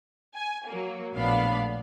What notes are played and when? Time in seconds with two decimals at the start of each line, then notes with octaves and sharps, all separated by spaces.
0.35 G#5
0.67 F#3 A#3
1.13 A#1 A2 B3 D4 F5 B5